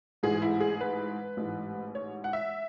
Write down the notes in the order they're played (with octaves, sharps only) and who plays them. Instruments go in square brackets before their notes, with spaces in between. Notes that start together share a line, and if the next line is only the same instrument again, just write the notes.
[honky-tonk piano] A1 G#2 E3 G#4
E4
G#4
B4
A1 G#2 E3
C#5
F#5
E5